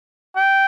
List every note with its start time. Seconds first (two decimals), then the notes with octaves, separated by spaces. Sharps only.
0.36 G5